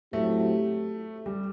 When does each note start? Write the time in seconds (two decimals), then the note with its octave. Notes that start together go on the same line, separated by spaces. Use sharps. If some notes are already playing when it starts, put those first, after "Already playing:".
0.13 A2 F#3 A3 C4 E4 G4
1.26 G3